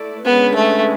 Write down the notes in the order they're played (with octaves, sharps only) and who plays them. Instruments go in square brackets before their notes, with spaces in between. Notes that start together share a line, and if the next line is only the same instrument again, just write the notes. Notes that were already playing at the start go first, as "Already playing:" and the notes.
Already playing: [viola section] A3 E4 D5
[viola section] D3 G#3 C#4 G#4 B4 [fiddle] B3
[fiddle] A3